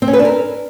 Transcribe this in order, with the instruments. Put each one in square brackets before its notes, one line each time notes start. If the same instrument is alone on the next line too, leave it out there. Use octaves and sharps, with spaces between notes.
[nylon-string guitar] C4
C#4
B4
D4
A#4